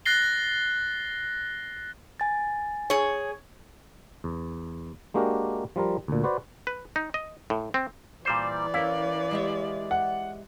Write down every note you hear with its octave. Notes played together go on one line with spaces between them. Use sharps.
F#6 A6 A#6 C7 G7
G#5 A6
G#4 C#5
E2
G#3 A#3 D4 F#4 G4 A#4
F3 G3 F4 A#4
D2 A#2
F#4 B4 C5 D5
B4
D#4
D#5
A2
C4
A#2 E3 G3 C5 D5
C#4 E4 A#4 F5
G#3 G4 E5
F#5